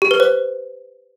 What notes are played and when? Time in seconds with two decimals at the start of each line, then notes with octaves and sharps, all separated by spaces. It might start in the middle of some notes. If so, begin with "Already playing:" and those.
0.02 G4
0.11 B4
0.20 C5